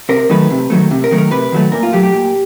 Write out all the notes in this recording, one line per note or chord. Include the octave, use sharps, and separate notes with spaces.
C3 A#4
D#3 F#3 A3 B4
C3
D#3 F#3 A3
C3
A#4
D#3 F#3 A3
A#4
C3 B4
D#3 F#3 A3
A#2 A#4
F4
F#3 A3 G4
G4
A#2